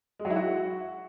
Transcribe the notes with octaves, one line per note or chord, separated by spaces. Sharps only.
G#3
F#3
E4
F#4